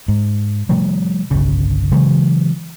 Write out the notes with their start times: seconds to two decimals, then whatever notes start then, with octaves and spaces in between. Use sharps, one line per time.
0.08 G#2
0.69 C3 F3 G3 A3
1.31 G1 C2 C#3
1.92 C#3 E3 F#3 G#3